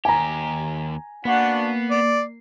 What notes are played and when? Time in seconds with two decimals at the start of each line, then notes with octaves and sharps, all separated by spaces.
0.05 D#2 G4 G#5 A#5
1.25 A#3 B3 D4 F#4 F#5 C7
1.90 D5